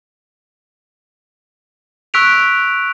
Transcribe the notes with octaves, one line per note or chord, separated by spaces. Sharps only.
C#6 E6 F#6 B6 D7 F7